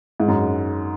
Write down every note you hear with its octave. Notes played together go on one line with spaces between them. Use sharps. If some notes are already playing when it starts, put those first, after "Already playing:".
G#2
F#2